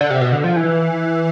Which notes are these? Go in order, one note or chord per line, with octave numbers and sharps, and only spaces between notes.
D3
C3
B2
D3
F3
E3